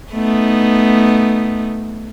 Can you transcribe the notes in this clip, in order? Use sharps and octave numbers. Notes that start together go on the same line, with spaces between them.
A3 B3 D#4